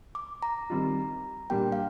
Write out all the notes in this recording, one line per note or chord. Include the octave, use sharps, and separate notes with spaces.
D6
A#5
D#3 G3 C4 F4
A#2 G3 A#3 D4 G4 G5
F5